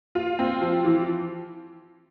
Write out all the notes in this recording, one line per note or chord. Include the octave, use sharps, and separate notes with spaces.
F4
C4
F3
E3